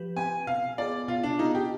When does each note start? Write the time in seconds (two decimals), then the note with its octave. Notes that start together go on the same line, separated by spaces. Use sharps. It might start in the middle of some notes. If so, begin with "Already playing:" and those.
Already playing: F3 G4 B4
0.16 C4 G4 B4 G#5
0.47 B2 F5
0.78 B3 F4 G#4 D5
1.08 B2 F4
1.23 D4
1.39 B3 D#4 F4 G#4
1.55 G4